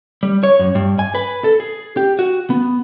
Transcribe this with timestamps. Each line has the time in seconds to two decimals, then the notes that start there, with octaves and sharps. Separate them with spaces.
0.23 G3
0.43 C#5
0.59 F#2
0.75 G2
0.99 G#5
1.15 B4
1.44 A4
1.60 G#4
1.97 G4
2.19 F#4
2.50 B3